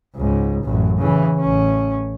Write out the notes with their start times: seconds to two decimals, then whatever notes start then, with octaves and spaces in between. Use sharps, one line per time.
0.16 C#2 G#2
0.64 A1 F#2
0.98 C#3 E3
1.40 A1 C#4